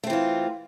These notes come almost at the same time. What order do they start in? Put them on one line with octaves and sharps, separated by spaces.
A3 C4 E3 F4